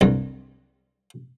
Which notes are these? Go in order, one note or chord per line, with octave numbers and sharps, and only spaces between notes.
C2 G2